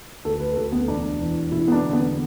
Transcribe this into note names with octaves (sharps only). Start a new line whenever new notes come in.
D2 A4
B4
D2 A4
B3
E1 D4
E2
E1 E4
B3
D4
D3
B3